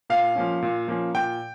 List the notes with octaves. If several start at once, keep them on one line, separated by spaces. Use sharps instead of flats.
A#2 F5
F3 A#3 C#4
A#2
F3 A#3 C#4
A#2 G5